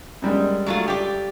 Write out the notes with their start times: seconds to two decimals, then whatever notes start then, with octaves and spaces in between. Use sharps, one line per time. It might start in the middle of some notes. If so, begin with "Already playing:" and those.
0.22 F#2 G3 G#3
0.66 F#3 A3 F4
0.88 G4 D5